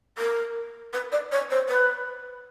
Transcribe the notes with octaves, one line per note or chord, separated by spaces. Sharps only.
A#4
B4
D5
C#5
C5
B4